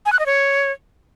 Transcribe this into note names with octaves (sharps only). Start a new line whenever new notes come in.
G#5
F#6
D#5
C#5